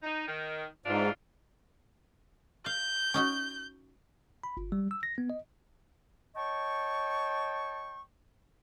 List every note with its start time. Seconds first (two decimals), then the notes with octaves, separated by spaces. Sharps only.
0.03 D#4
0.28 D#3
0.86 G#2 E3 D4 F4
2.66 F5 G6
3.14 C#4 D#4 F#4
4.44 B5
4.57 G1
4.72 G3
4.91 E6
5.03 A#6
5.18 B3
5.30 D#5
6.35 C#5 D#5 G5 A5 C#6